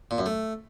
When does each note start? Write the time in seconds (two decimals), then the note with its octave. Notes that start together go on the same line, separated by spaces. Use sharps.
0.11 A#2
0.18 F#2
0.26 A3